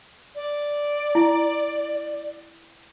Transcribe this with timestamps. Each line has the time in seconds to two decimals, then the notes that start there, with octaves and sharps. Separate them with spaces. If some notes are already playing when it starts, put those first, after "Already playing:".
0.35 D5
1.15 E4